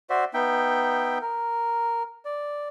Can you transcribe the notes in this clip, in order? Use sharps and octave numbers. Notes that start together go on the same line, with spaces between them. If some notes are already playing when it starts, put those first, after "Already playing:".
F#4 C5 D5 E5
B3 D#4 E5 G5
A#4
D5